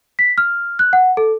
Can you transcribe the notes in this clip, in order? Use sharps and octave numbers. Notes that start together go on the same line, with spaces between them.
B6
F6
F#6
F#5
A4